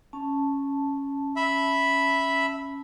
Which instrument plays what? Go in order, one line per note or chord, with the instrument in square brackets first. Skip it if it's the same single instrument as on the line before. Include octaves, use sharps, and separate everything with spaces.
[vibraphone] C#4 A5
[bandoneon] E5 B5